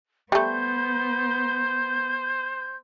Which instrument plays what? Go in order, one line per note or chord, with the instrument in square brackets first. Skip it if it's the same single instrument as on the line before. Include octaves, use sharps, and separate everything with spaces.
[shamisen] G3 A3 [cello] B3 [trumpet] C5 [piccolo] G6